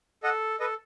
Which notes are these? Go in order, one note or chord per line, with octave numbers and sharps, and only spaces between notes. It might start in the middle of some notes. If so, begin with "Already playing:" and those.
A4 D#5 F#5
A4 B4 D#5